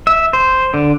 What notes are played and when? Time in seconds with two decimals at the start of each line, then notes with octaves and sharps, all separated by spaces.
0.07 E5
0.33 C5
0.74 D3